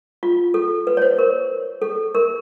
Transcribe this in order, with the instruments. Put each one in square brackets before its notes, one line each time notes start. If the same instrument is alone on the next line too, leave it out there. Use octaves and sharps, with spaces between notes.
[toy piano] F4
A4
B4
C#5
C5
A#4
A4
A#4